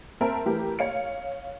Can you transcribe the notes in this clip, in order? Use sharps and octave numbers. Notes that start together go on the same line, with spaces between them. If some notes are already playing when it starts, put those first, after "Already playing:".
C4 A#4 E5 A5
E3 A3 G4 A#4 B4
C#5 F5 C#7